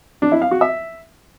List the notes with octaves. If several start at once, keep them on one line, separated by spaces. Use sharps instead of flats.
D4
E4
F5
F#4
E5